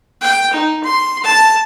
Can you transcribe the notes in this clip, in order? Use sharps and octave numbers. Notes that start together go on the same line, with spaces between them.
G5
D#4
C6
A5